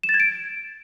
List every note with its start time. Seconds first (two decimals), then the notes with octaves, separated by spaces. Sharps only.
0.03 E7
0.09 A6
0.14 G#6
0.20 D7